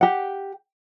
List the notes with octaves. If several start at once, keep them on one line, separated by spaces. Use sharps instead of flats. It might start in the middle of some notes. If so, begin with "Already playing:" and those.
G4 F#5